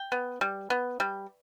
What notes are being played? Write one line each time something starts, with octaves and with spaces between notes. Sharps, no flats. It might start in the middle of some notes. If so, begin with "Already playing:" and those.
Already playing: G5
B3
G3
B3
G3